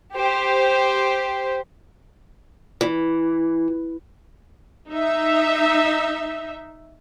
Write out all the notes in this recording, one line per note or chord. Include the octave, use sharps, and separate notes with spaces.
G4 C5
E3
D#4 E5